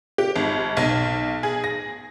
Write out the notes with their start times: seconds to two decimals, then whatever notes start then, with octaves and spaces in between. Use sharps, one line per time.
0.18 G4
0.36 G#1
0.77 B1
1.43 G#4
1.64 A#6